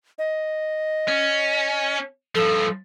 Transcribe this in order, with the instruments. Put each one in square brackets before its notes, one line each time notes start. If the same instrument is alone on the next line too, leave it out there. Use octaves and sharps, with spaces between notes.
[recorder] D#5
[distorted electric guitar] C#4
[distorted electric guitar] G2 F3 [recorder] A4